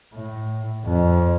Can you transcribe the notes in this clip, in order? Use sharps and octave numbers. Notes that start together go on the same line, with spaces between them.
A2
F2